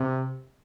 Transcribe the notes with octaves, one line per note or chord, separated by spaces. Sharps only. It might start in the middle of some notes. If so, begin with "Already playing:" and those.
Already playing: C3